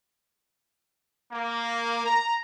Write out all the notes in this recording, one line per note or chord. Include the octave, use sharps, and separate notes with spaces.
A#3
A#5